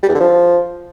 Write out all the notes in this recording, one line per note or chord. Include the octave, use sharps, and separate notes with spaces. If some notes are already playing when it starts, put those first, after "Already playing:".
G3
E2
D3
F3